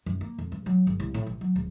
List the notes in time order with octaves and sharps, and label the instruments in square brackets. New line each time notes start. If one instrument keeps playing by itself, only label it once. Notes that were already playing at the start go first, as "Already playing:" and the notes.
[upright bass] F#2
A#3
F2
G2
F#3
G1
C2
A2
A1
F#3
D1